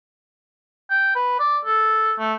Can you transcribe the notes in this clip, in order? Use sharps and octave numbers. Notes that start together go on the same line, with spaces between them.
G5
B4
D5
A4
A3